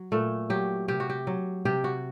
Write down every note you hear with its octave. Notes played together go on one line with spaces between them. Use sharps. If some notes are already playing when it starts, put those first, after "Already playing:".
Already playing: F#3
A#2 A3
F#3 G4
C3 G4
F#4
G4
F#3
C3 G4
F#4